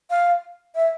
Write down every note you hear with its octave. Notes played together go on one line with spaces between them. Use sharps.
F5
E5